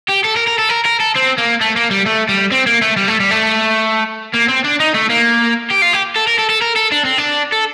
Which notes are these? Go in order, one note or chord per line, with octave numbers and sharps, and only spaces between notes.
G4
A4
A#4
A#4
A4
A#4
A#4
A4
C4
A#3
A3
A#3
G3
A3
G3
C4
A#3
A3
G3
A3
G3
A3
A#3
C4
D4
D#4
A3
A#3
G4
F4
G4
A4
A#4
A4
A4
A#4
A4
D4
C4
D4
A4